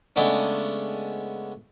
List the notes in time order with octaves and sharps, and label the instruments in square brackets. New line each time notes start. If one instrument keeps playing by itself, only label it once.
[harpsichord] C#3 G#3 A3 B3 C#4 D4